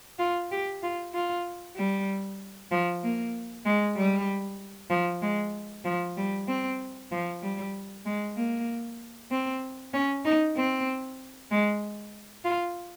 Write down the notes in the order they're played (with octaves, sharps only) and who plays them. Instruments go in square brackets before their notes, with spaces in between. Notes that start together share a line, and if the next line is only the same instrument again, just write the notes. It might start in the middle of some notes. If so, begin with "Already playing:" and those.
[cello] F4
G4
F4
F4
G3
F3
A#3
G#3
G3
F3
G#3
F3
G3
C4
F3
G3
G#3
A#3
C4
C#4
D#4
C4
G#3
F4